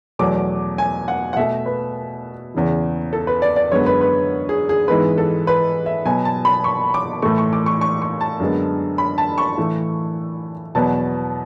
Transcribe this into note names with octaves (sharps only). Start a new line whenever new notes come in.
E2 B2 F#3 A3 D6
G#5
F#5
F#5
B2 A3 E5
B4
E2 C#3 E3
A4
B4
D5
D5
F#2 D3 G#3 B3 C#5
B4
B4
G#4
G#4
G#2 E3 G#3 B3 B4
A4
B4
E5
B2 F#3 B3 G#5
A5
B5
C#6
D6
A2 E3 A3 C#6
C#6
D6
C#6
C#6
C#6
A5
F#2 D3 G#3 B3
B5
A5
C#6
A2 E3 A3
E2 B2 F#3 B3 A5